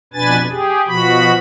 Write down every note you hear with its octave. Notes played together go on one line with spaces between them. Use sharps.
F2 B2 D4 B4 G#5 A6
G4 G#4
B2 F3 F#4 B5